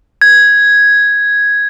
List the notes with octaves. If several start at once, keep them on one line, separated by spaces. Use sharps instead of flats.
G#6